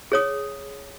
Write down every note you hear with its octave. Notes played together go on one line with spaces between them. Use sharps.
G#4 C#5 D#6